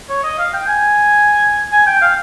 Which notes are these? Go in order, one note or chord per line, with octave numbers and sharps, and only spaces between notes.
C#5
D#5
F5
G5
G#5
G#5
G5
F5